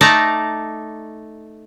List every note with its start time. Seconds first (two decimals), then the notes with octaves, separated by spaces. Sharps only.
0.01 A3 D#4 D5 A5 A#5